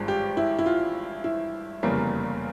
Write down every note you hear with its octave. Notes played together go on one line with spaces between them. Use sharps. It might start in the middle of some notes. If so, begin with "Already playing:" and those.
Already playing: G#1 G2 F3 G#3
G4
E4
E4
F4
E4
F1 E2 C#3 G3 A#3